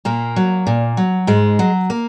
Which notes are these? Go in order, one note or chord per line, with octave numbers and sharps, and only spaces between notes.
A#2 A#3
F#3
A#2
F#3
G#2 G#3
F#3
A#3